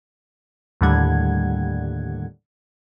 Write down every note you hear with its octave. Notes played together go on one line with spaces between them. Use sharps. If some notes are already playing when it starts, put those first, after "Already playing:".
D#2 A2 D3 G3 F#5 G#6